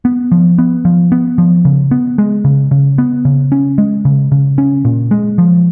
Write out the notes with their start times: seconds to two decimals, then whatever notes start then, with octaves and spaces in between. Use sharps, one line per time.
0.05 B3
0.32 F3
0.58 B3
0.85 F3
1.12 B3
1.38 F3
1.65 C#3
1.91 B3
2.18 G#3
2.45 C#3
2.71 C#3
2.98 B3
3.25 C#3
3.52 C#4
3.78 G#3
4.05 C#3
4.32 C#3
4.58 C#4
4.85 A#2
5.11 G#3
5.38 F3